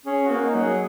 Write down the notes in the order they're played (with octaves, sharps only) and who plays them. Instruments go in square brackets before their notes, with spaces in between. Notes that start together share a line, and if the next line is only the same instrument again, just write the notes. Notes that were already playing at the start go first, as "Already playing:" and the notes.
[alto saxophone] C#4 [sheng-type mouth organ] G#4
[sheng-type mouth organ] F#4
[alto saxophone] A#3
[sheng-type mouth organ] D#4
[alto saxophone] F#3
[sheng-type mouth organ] G#4